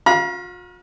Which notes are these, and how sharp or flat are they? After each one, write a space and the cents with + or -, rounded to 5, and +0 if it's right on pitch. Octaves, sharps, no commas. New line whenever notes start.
F4 +45 F5 +0 A#5 +45